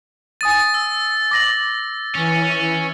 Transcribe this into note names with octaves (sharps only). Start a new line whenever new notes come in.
G#5 D#6 A6 D#7
E6
D6 A#6 F#7
E3 C#4